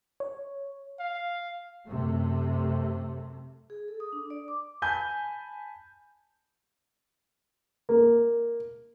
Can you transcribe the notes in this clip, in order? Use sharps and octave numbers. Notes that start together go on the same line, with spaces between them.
C#5
F5
F#2 C3 A3
G#4
A4
D#6
D4
D5
D6
G#5 A5 B5 G6
A#3